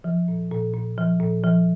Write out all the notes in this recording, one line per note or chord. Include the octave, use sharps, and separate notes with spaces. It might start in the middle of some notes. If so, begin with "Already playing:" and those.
F3
A#2
A#2
A#2
F3
A#2
F3